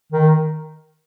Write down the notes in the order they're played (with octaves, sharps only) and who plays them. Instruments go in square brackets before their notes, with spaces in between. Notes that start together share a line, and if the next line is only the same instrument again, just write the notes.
[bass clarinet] D#3